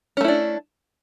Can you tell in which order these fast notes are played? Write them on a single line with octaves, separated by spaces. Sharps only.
C#4 A3 E4 D4